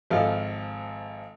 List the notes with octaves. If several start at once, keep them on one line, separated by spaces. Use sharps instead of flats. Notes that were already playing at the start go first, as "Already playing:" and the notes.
G#1 F3 A4 F5